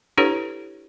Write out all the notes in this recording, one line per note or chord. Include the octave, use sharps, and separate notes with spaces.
D4 E4 G4 A4 B4 C#5